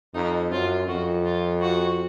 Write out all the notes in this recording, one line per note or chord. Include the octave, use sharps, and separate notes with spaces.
F2 D#4
F#2 F4
F2 F#4
F4
F#4